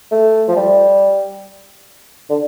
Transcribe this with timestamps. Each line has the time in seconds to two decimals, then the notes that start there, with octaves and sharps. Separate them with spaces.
0.12 A3
0.48 F3
0.56 G3
2.30 D3